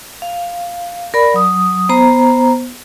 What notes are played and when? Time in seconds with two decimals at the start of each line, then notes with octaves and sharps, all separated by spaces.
0.22 F5
1.14 A#4 D5 B5
1.34 F#3 D#6
1.89 B3 C5 A#5